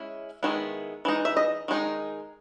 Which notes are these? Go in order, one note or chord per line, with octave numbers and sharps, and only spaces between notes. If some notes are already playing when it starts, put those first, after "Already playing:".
Already playing: G#3 C#4 E4
D#3 G#3 B3 E4
E3 G#3 D#4
E5
D#5
D#3 G#3 D#4